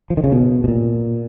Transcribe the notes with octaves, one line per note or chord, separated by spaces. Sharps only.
F3
D#3
C#3
B2
B2
A#2